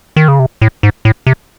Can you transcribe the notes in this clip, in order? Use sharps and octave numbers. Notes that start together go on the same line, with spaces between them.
D#3
C#3
C3
A2
G#2
A2
C3